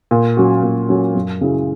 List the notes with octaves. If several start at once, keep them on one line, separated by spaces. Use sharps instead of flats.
A#2
F#3 C#4 F#4
A#2
F#3 C#4 F#4
F#2
C#3 F#3 C#4 E4